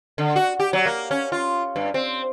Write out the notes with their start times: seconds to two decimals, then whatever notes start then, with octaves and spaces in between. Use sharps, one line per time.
0.18 D3
0.36 F#4
0.60 G4
0.73 F#3
0.86 A#3
1.11 C#4
1.32 F4
1.76 G2
1.94 C4